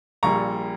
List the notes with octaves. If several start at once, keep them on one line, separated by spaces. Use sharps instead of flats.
A#1 A#2 G3 A#5 C#6